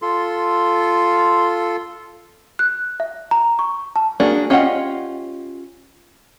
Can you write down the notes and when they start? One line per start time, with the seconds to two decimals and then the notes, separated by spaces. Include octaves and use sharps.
0.02 F4 A4 C6
2.59 F#6
3.00 E5
3.31 A#5
3.59 C#6
3.96 A5
4.20 A#3 D4 F#4 G#4
4.50 C#4 F4 G4 D#5 F#5